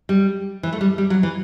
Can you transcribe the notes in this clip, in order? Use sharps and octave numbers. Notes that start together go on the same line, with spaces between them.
G3
E3
A3
G3
G3
F#3
E3